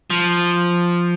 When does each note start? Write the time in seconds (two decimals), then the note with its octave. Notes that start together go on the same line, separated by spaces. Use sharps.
0.10 F3